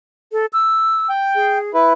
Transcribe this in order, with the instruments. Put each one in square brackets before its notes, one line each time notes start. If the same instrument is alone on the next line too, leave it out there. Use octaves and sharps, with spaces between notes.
[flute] A4
E6
[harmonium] G5
[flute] G#4
[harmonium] E4 B4